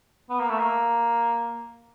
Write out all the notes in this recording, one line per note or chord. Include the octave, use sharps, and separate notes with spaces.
B3
A#3
A3
A#3